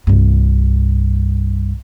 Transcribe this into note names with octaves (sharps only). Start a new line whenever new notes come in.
C2 G2